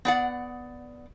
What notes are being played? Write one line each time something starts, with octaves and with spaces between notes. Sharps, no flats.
B3 D5 F#5